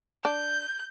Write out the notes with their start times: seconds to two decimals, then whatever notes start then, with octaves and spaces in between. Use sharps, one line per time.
0.25 D4 G6